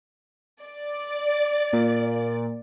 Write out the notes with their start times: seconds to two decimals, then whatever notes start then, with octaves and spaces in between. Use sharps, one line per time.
0.64 D5
1.73 A#2